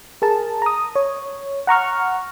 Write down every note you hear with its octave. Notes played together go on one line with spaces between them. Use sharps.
G#4 A#4 A5
A#5 D#6
C#5
F#5 A#5 C#6 F6